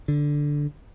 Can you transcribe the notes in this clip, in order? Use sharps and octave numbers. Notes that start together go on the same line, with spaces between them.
D3